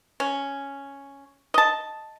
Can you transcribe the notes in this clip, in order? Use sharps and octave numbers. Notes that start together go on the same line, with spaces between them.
C#4
D#5 A5